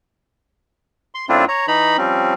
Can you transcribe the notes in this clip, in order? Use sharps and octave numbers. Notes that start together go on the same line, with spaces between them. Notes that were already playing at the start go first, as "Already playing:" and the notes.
C6
F#2 A3 C4 D4 E4 F4
C#5 A#5
E3 D#4 A#5 B5
F3 G3 C4 C#4